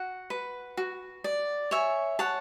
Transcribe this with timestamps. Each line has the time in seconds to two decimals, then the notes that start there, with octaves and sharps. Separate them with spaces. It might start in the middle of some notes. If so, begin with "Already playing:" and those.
Already playing: F#4 F#5
0.30 B4
0.77 F#4
1.24 D5
1.71 C#5 E5 G#5
2.19 C#5 F#5 A5